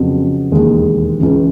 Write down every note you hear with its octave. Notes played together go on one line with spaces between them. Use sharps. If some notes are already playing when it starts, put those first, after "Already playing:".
Already playing: F2 C#3 F#3 B3
E1 D#2 D#3 G#3
C#2 C#3 E3